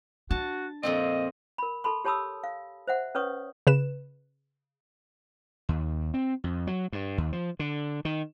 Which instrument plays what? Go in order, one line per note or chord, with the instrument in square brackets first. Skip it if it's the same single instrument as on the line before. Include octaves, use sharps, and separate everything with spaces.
[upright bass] D4 [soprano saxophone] F#4 [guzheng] A5
[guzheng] F2 A#2 C4 [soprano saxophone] D#5
[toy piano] A#4 B5
A4 A5 B5 C6
G4 C#5 A5 B5 D#6 E6
F5
C5 E5 F#5
C#4 B4 C#5 C#6 D#6
[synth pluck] C#3 B4 E7
[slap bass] D#2
C4
F2
F#3
G2
D#2
F3
D3
D#3